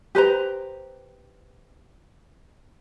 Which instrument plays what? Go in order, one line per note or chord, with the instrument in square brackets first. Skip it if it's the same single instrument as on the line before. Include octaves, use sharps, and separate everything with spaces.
[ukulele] G4 B4 C5 A#5